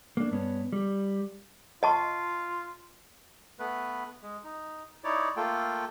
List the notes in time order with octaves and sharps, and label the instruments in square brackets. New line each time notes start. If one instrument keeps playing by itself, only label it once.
[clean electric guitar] A#3 D4
G2 B3 C#4
G3
[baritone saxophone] F4 [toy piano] D#5 A5 C#6
[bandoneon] A3 B3 B4
G#3
D#4
D#4 E4 C#5 D5
A3 A#3 F4 A4 G5